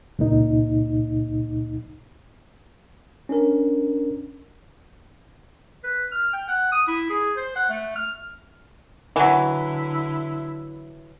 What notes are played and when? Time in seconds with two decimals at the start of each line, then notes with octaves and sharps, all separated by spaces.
0.19 C#2 A#2 D#4
3.29 C#4 D4 A#4
5.84 B4
6.12 F6
6.33 G5
6.48 F#5
6.72 D#6
6.88 E4
7.10 G#4
7.37 C5
7.56 F#5
7.69 A3
7.96 F6
9.16 D3 E3 F#3 E4